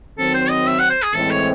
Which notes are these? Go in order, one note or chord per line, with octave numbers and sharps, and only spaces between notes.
D#3 F#3 C4 A4
C5
D#5
E5
F#5
C5
G#4
A2 E3 G#3 C4 A4
C#5